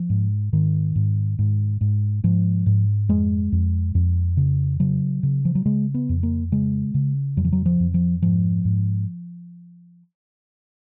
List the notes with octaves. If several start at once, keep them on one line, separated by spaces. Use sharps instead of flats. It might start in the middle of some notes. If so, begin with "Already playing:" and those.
Already playing: F3
G#2
G#2 D#3
G#2
G#2
G#2
G#2 F3
G#2
F2 G#3
F2
F2
C#3
C#3 F#3
C#3
F3
F#3
C#3 G#3
B3
F2
A#3
C#3 G#3
C#3
F2 F#3
F3
F#3
F3
F2
F3
G#2 F3
G#2